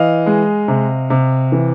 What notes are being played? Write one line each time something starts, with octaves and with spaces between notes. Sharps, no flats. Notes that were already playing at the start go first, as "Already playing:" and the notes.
Already playing: E3 D#5 F5
G#3
C3
C3
E3